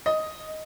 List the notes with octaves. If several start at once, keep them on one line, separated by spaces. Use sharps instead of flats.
D#5